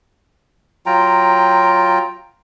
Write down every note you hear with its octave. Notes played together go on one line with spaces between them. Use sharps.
F#3 F4 G5 A#5